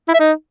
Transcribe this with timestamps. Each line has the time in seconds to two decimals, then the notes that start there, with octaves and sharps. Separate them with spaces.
0.08 E4
0.14 E5
0.20 D#4